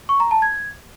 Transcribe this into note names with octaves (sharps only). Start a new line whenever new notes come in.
C#6
A#5
A5
G#6